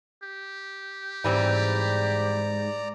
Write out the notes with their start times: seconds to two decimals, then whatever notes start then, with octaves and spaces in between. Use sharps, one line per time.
0.23 G4
1.24 G#2 E3 G3 C4 D5 A#5